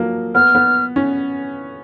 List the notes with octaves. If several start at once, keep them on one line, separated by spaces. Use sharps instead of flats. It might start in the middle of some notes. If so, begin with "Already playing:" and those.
Already playing: F3 F#3 A#3
B3 F6
B3
C#4